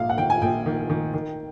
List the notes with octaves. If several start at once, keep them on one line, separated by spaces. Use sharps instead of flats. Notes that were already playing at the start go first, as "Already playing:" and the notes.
Already playing: A#1 G#2 F5
F#5
D#3 G5
G#5
A#1 G5
D#3
D#3
D#3